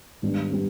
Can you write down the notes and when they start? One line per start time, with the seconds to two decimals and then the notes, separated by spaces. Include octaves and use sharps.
0.22 G#2 D#3 G3 B3 D4
0.51 G3 B3 D4